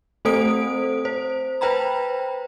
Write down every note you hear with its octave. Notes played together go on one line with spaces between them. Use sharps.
A3 C4 A4 C5 D#6 D7
C5
B4 C5 G5 A#5 B5